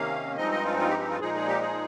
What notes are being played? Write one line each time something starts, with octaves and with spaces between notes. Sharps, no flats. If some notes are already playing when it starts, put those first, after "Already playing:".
Already playing: C3 D#3 A#3 C#4 F5
G2 F3 G#3 C4 D#4 D#5
D#5
F4
F4
G4
G4
F4
A#2 F3 G#3 D#4 G#4
G#4
G4
G#4